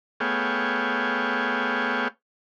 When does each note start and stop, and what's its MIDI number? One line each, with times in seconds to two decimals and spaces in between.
0.20 2.08 57
0.20 2.08 59
0.20 2.08 68
0.20 2.08 73
0.20 2.08 77
0.20 2.08 79